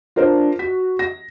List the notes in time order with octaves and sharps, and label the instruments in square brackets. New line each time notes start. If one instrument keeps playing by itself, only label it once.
[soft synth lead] D4 [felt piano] F4 A#4 C5
[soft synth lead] F#4 [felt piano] B6
[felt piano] A#6